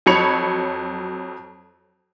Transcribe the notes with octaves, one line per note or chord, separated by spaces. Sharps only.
F2 F#3 C#5 B5 C#7 F7